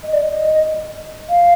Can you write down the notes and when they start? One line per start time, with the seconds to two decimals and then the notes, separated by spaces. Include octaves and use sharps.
0.04 D#5
0.13 D5
0.23 D#5
1.29 F5